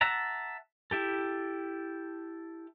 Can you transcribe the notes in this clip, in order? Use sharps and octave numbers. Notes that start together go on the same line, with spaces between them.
E5 F#5 A5 A#5
E4 G4 A4